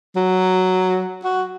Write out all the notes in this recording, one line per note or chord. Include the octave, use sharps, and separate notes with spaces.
F#3
F#4